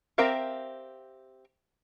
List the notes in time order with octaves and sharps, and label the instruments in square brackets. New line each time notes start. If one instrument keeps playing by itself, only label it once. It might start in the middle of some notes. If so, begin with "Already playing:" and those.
[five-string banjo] C4 G4 A#4 E5 F5